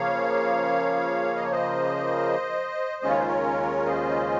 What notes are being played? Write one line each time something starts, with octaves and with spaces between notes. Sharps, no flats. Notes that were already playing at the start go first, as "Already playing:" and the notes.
Already playing: C#3 F3 A#3 C#5 F5
D#5
C#5
C5 D#5
D#2 C#3 G#3 C#4 F4 D#5
C#5
C5
A#4 C#5
C5 D#5